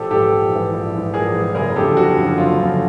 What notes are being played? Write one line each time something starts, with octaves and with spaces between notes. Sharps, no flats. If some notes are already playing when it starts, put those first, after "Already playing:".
Already playing: A#1 G4 A4
G#2 E3 G4 A4
A#1
G#2 E3
A#1
G#2 E3
A#1 G#4 A#4
G#2 E3
F#1 G#4 A#4
F#2 D3 F3 G4 A4
F#1 F#4
F#2 D3 F3
F#1 F4
F#2 D3 F3